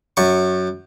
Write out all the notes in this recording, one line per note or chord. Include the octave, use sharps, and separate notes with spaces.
F#2 C#6